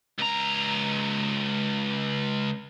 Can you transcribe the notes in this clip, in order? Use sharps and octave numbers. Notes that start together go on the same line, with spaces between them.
C#2 A#5